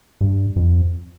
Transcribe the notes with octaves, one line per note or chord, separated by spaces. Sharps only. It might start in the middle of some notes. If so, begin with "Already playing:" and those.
G2
F2